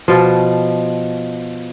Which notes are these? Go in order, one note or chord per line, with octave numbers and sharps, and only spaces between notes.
B2 F3